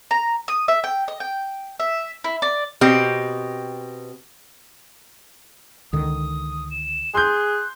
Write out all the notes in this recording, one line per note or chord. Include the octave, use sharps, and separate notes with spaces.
A#5
D#6
E5
G5
D#5
G5
E5
E4
D5
B2 C4 G4
C#2 D3 D#3 D#6
E7
G#4 C6 F#6 G6